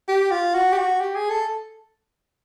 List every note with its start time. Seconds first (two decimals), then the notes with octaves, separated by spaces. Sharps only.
0.08 G4
0.31 F4
0.54 F#4
0.72 G4
0.77 F#4
1.00 G4
1.16 G#4
1.30 A4